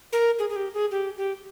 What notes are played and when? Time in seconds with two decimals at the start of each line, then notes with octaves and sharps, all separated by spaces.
0.13 A#4
0.39 G#4
0.50 G#4
0.56 G4
0.74 G#4
0.91 G4
1.17 G4